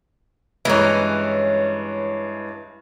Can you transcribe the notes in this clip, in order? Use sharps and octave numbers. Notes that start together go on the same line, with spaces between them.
G2 E3 G#3 C#4 A#5